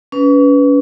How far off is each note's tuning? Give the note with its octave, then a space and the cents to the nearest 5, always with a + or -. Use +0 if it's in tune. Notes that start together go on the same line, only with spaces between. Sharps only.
C#4 +35 B4 +0